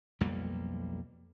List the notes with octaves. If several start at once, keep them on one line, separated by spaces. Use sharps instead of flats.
B1 F2 G3 A#3